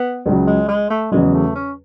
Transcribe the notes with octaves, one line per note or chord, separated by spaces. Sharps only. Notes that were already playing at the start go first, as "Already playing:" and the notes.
Already playing: B3
C#2 C#3 F#3
G#3
G#3
A3
E2 C#3 F#3 G#3
A3
C#4